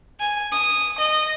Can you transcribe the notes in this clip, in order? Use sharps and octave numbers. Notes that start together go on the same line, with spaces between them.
G#5
D#6
D#5